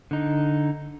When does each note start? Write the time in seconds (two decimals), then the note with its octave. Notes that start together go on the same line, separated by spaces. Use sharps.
0.11 D3 D#4